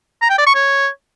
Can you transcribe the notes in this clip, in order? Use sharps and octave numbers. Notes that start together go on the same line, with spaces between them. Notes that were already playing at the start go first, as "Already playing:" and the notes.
A#5
G5
D5
C#6
C#5